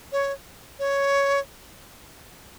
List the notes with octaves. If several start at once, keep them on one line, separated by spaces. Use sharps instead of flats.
C#5
C#5